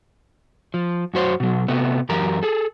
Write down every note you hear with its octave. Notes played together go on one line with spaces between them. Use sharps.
F3
F#2 F#4 C5 C#5
B2 F#3
C3 A3 B3
F#2 E3 G4 A#4 A#5
G#4 A4